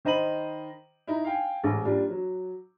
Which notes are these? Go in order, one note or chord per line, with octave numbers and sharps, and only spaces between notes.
D#3 C5 D#5 B5 D#7 F#7
D#4 E4
F5 G5 G#5
A1 G#2
G3 A#3 D4 F4
F#3